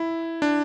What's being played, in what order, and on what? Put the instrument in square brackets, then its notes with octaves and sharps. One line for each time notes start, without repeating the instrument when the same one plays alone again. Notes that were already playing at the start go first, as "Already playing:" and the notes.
Already playing: [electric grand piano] E4
D4